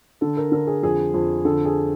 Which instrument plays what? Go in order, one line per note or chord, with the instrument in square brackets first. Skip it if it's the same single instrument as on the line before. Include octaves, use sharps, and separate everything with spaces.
[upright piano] D3 A4
A#4
D3 A#4
G#4
F2 G#4
F2
D3 A4
G#4